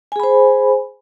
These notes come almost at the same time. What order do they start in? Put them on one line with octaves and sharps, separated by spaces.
G#5 G#4 B5 C5